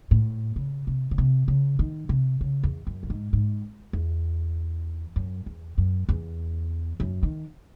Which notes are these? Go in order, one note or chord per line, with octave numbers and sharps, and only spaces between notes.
A2
C#3
C3
C#3
C3
C#3
D#3
C3
C#3
E2
F#2
A2
G#2
G#2
E2
F#2
E2
F#2
E2
F#2
D#3